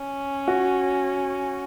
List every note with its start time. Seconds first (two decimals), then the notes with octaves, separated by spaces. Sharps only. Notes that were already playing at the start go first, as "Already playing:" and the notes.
Already playing: C#4
0.48 F#4